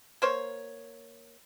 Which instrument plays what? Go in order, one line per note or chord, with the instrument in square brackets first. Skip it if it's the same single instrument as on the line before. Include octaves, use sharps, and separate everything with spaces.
[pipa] A#3 C5 C#5